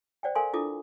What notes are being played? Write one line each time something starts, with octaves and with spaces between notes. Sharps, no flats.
C5 D5 F#5 G5
A4 A#4 F5 G#5 C6
D4 E4 F4 A4 D6 D#6